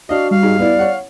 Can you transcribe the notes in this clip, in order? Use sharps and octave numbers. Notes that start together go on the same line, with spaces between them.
D4 F#4 D#5 F5
G3 F5
G#2 G#3
B3 E4 D5
C#5 F#5